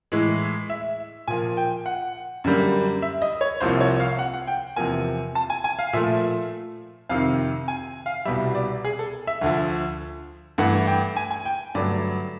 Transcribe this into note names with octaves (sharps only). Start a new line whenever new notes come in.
A2 E3 G#3
E5
A#2 F3 A#3 G#5
G5
F#5
F#2 D3 G3 A#3
E5
D#5
C#5
C2 C3 F3 A#3 C5
C#5
F5
F#5
F#5
G5
E2 C3 F3 A#3 G#5
A5
G#5
G#5
F5
A#2 F3 A3 E5
F2 C3 D#3 F5
G#5
F5
C2 B2 G3 E5
D5
G#4
A4
E5
D2 D3 F3
G2 E3 A3 F#5
G5
G#5
G#5
G5
G2 D3 F#3 A3 D5